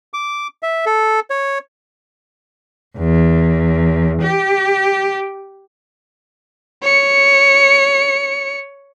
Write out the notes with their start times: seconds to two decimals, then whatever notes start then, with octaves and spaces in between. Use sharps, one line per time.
0.14 D6
0.63 E5
0.86 A4
1.30 C#5
2.98 E2
4.22 G4
6.83 C#5 C#7